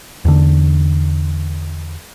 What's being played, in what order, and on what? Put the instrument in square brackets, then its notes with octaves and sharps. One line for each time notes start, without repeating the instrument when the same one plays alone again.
[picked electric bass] E2 D3